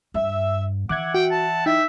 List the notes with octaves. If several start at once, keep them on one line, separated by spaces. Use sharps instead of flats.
G2 E5
E3 E5 F#5 D6 F#6 G#6
F#4 G5
A5
D#4 E4 E5 G5